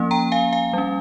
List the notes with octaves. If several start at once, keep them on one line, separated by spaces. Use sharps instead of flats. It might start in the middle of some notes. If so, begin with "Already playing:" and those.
Already playing: F3 A#3 C#4
G5 A#5
F5 G#5
F5 G#5
G3 C#4